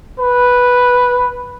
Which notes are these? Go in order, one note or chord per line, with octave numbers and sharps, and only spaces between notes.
B4